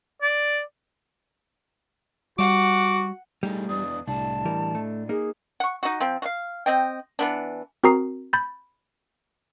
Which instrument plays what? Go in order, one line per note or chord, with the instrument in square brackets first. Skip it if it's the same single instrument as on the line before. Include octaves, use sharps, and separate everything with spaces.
[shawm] D5
[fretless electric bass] G3 [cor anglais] F#4 [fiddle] F#5 [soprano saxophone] D6
[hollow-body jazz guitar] G3 [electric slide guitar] A3 D#4 G#4
[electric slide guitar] E2 B3 D4 [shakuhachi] D#6
[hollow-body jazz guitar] C2 [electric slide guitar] A2 D4 [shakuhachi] A5
[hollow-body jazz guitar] E3 G3 A#4
A3
[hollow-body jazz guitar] A#3 D#4 [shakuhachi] G#4
[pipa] F#5 C#6
D#4 F#4
F3 C4
F#4 F5
C4 D#5 G5
E3 B3 D4
[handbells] C4 F#4 A#4 A#5 D#6 C7
B5 G6 A6